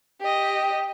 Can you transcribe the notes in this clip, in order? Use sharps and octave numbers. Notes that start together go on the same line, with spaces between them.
G4 D#5